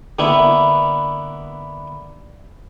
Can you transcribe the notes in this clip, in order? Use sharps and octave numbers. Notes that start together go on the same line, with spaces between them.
D3 A#3 B3 E4